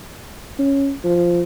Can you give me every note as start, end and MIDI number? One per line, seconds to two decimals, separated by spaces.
0.59 0.92 61
1.04 1.43 53